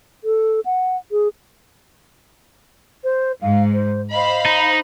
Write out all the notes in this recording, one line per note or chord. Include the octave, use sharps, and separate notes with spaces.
A4
F#5
G#4
C5
G#2 F5
C5
C5 D#5 F5 B5
D#4